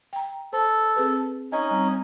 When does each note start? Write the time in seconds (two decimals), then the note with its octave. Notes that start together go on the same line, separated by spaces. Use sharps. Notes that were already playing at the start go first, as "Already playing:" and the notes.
0.13 G5 A#5
0.53 A4 C5
0.96 C4 G#4 B4
1.52 C#4 D#4 D#5 G#5
1.71 G3 C4